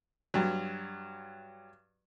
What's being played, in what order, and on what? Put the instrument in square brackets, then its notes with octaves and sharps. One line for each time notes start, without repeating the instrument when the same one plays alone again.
[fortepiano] G2 F#3